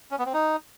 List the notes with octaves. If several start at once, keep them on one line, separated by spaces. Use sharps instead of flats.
C#4
B3
C4
D#4